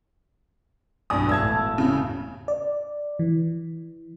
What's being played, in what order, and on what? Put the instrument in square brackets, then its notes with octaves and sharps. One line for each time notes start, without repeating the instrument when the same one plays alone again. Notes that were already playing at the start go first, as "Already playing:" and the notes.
[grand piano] B1 D4 G#5 [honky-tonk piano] G2 D#6
[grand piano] E1 A2 G#6 [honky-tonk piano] A5 E6
[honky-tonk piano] C#3
[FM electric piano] D5
E3